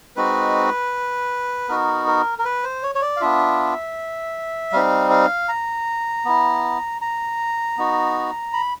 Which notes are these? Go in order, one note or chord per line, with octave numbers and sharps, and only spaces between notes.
G#3 C4 D#4 F#4 B4
B3 D#4 F#4 A#4
A#4
A#4
B4
C5
C#5
C#5
D5
F5
B3 D4 F4 E5
G3 C4 D#4 F5
F5
A#5
B3 E4
A#5
B3 D#4 F#4
B5